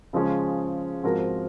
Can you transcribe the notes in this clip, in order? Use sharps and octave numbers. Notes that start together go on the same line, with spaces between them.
C#3 F3 G#3 C#4 G#4
G#2 F3 C4 F#4 A#4